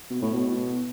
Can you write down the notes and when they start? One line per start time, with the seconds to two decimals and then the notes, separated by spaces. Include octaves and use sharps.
0.10 B2
0.22 A2
0.33 B2